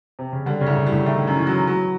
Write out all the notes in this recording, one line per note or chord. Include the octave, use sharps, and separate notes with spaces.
C3
C#3
D3 G3
C#3
C2
A2
G3
A2
D#3 A3
F#2
E3
F#3
E3 F#3